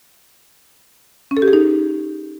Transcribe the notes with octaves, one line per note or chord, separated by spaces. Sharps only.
C#4
A4
G4
G#4
D#4